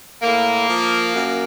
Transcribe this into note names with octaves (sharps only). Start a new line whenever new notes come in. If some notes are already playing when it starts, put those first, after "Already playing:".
A2 A#3
F3
F#2